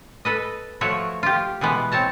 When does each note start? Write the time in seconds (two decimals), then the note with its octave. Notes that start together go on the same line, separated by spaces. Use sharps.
0.25 A4 B4 D#5
0.81 F3 A3 F#4 C#5 E5
1.23 F4 G4
1.61 B2 E3 G#3 B3
1.92 C4 C#5 A5 A#5